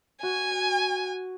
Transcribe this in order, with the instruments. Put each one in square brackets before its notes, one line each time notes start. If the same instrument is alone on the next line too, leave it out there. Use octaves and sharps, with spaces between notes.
[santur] F#4 [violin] G#5